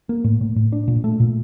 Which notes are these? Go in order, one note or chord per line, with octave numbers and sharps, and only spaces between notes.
A#3
A2
A2
A2
D4
A#2
A3
A#2